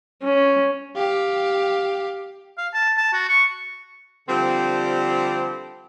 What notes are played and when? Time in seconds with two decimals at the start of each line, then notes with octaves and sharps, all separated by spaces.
0.22 C#4
0.96 G4 F5
2.58 F5
2.74 A5
2.98 A5
3.13 F#4
3.29 C#6
4.29 D3 F3 G3 C4